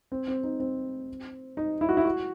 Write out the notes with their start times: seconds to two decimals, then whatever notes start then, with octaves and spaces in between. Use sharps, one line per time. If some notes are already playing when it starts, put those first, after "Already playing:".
0.12 C4
0.28 C4
0.44 D#4
0.60 C4
1.57 D#4
1.81 E4
1.89 F#4
1.97 E4
2.05 F#4